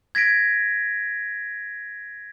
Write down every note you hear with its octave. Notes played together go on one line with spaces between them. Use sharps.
G#6 A#6 B6 D7